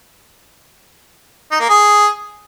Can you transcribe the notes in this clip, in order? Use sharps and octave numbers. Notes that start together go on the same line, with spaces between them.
D#4
A#3
G#4